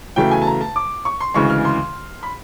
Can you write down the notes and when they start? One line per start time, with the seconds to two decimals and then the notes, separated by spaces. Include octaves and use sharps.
0.16 E2 C#3 F#3 A3 G5
0.31 G#5
0.42 A5
0.47 A#5
0.61 A5
0.76 D6
1.05 C#6
1.20 C6
1.34 D2 C#3 E3 G#3 C#6
1.50 F6
1.65 C6
2.23 B5